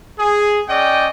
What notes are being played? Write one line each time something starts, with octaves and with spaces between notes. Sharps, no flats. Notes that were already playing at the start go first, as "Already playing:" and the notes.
G#4
C#4 D5 D#5 G5